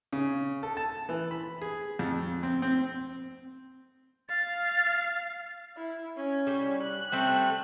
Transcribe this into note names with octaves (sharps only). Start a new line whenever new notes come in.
C#3
A4
A5
E3
B5
G#4
F2
C4
C4
F5 A6
E4
C#4
G3
F#6
G3 A3 C4